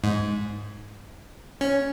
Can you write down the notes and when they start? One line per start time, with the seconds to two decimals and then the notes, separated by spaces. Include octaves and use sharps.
0.04 G#2
1.61 C#4